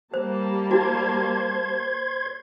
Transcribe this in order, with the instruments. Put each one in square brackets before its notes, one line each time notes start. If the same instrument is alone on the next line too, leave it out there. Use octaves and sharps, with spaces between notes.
[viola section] G3 A#3 A5 [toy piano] C5
[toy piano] E4 F#4 [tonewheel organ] C5 C6 G#6